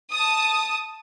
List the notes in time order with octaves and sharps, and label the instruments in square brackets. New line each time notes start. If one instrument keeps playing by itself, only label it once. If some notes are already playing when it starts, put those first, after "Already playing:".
[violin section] A5 D#6